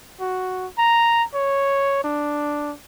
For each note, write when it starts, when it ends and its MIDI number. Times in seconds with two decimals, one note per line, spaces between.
0.20 0.67 66
0.78 1.23 82
1.34 2.04 73
2.04 2.73 62